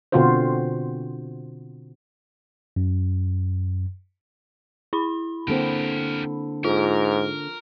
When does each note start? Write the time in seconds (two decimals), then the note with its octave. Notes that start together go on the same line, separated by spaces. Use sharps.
0.12 B2 D3 C4 F4 F#4 C5
2.76 F#2
4.93 E4 B5
5.48 D3 A#3 C4 G4 A#4
6.64 G#2 F4 A#4